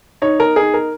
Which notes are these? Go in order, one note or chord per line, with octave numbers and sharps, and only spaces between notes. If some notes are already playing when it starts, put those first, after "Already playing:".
D#4 C#5
A#4
D#4 G#4
A#4